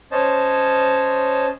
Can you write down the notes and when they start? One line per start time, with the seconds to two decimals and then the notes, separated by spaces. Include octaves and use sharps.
0.12 C#4 C5 C#5 D#5 A5